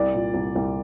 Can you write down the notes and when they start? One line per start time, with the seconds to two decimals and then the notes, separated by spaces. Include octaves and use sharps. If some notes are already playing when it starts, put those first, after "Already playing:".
Already playing: C2 D5
0.15 A#2
0.34 C2
0.55 C2